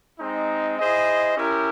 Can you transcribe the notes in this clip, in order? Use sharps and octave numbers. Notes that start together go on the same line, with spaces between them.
G#3 C4 D#4
E4 G#4 C5 D#5
C#4 E4 G4 A#4